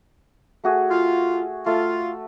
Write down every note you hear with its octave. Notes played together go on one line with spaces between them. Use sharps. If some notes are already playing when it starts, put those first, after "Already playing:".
A3 F#4 G#4
F4
A3 F4